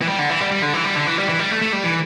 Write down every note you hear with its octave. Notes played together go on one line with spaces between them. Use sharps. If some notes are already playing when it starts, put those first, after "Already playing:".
E3
G3
D3
E3
G3
G3
D3
E3
G3
D3
E3
G3
E3
G3
A3
A3
G3
E3